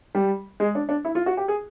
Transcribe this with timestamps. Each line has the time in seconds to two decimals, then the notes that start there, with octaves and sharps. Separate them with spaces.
0.15 G3
0.60 G#3
0.75 D4
0.89 D4
1.05 E4
1.15 F4
1.26 F#4
1.37 G4
1.48 G#4